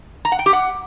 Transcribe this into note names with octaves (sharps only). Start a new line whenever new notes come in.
A#5
F#5
G5
G4
F#5